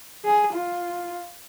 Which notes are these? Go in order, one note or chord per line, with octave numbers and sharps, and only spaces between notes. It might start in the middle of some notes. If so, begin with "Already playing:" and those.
G#4
F4